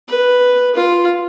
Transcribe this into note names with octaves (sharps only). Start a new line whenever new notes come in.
B4
F4